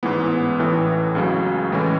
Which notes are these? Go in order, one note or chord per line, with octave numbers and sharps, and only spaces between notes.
A1 G#2 E3 B3 E4
A1 A2 E3
C#2 C#3 F#3 C#4
A2 E3 G#3 C#4